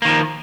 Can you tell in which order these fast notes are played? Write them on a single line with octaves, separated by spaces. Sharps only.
A#3 D#3 F3